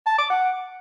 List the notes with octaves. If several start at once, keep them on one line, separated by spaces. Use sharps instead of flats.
A5
D6
F#5